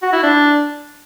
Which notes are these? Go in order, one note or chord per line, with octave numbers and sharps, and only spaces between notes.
F#4
E4
D4